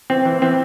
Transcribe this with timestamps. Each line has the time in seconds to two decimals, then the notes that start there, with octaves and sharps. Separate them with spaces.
0.10 E3 C4
0.25 E3
0.42 E3 C4